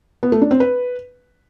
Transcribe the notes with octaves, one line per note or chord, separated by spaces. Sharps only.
B3
A3
D4
C4
B4